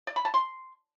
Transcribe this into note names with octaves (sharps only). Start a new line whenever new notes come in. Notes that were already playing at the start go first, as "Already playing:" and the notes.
D5
B5
A5
C6